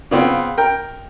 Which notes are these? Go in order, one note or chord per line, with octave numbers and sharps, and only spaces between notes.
C#3 B3 C4 F4
A#4 G5